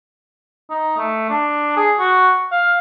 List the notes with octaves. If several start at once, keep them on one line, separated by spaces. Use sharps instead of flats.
D#4
A3
D4
G#4
F#4
F5